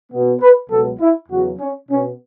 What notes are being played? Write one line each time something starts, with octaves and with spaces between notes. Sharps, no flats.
B2 B3
B4
C#2 B2 F#3 B3 A4
E4
E2 C#3 F#3 B3 F#4
C#4
B2 B3 C#4